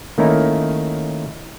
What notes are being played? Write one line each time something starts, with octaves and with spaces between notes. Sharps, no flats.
D#3 A3 A#3 C#4 D#4 E4